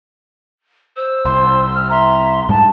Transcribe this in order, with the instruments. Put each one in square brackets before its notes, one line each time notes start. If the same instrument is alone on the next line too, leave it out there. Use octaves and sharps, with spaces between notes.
[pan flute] C5 [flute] E6
[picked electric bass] C2 [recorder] C6
[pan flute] F6
[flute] E5 [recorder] A#5 [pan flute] C6
[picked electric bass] G#2 G3 G#3 [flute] A5